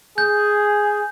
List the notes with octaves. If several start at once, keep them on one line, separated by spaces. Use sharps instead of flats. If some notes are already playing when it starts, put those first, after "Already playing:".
G#4 G6